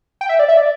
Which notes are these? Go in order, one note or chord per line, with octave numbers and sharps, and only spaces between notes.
G5
E5
D5
E5
D5